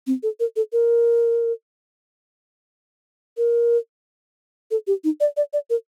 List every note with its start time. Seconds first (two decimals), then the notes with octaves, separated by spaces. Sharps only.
0.07 C4
0.23 A4
0.40 A#4
0.56 A4
0.73 A#4
3.37 A#4
4.71 A4
4.87 G4
5.04 D#4
5.20 D5
5.37 D5
5.53 D5
5.70 A#4